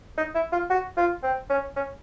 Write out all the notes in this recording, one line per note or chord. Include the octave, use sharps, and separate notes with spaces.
D#4
E4
F4
F#4
F4
C4
C#4
C#4